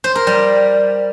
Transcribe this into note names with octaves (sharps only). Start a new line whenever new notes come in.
C5
A#4
G3